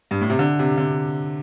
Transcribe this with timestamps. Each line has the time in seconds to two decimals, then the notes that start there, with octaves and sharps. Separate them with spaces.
0.11 G2
0.21 A2
0.30 C3
0.39 D3
0.59 C3
0.77 D3